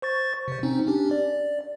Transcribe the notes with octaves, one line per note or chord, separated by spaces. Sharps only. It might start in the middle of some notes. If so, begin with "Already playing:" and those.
C5 C#6 A6
C3 C5
C4 C#4 D#4
C#4 D4 G4
D5